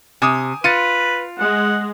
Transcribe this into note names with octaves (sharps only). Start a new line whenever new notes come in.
C3 G#5 D6 D#6
F4 B4 A6 C#7 D#7
G#3 F#5